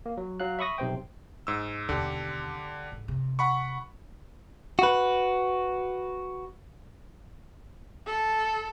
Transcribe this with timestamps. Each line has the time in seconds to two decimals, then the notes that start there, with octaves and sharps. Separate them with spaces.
0.06 A#3
0.17 F#3
0.40 F#3 F5 F#6
0.59 E5 B5 C#6 D#6 A#6
0.78 B1 C3 C5 G5
1.47 G#2 E6
1.89 D#2 B2 D3 G4
2.92 G#2
3.08 C3
3.39 F#5 B5 C#6
4.79 F#4 B4
8.07 A4